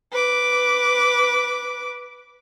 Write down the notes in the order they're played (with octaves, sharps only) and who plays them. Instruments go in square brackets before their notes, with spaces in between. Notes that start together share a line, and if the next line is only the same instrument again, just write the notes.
[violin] B4 D6